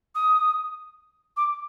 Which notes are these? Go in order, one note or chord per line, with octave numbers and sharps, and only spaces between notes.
D#6
D6